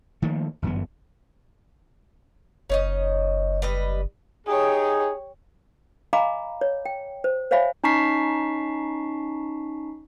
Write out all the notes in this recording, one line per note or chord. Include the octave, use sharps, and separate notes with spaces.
D#3 F3 A3 A#3
G1 F#2 E3 B3
F#1 C#4 D#4 D#5
G3 B4 D#5
D#4 G4 G#4 C#5
D#5 F5 G#5 A#5 B5 D6
C#5
G5
C5
C5 C#5 E5 F5 G#5 B5
C#4 D#4 A5 C#6 B6 C7